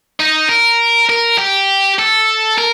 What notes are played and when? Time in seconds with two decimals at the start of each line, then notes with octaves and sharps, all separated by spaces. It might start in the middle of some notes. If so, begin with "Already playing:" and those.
0.20 D#4
0.49 A#4
1.09 A#4
1.38 G4
1.99 A4
2.58 A#4